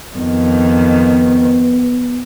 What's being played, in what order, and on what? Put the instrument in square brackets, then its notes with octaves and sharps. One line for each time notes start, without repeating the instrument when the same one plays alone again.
[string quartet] F2 D#3 [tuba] B3